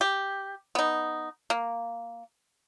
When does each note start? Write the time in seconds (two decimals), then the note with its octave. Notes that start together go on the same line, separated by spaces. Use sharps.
0.01 G4
0.75 B3 D#4
1.50 A#3